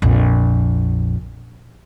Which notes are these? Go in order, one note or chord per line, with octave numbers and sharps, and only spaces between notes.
A#1 F2